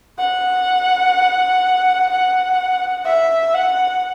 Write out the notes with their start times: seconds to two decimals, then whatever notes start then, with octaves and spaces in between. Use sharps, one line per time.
0.18 F#5
2.10 F#5
3.06 E5
3.54 F#5